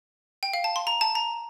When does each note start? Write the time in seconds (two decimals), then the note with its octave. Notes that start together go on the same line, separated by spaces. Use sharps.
0.43 G5
0.53 F5
0.64 A5
0.76 C6
0.87 A#5
1.01 A5
1.15 A#5